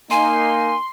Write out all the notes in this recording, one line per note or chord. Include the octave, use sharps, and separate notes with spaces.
A#3 D#4 G#5 C6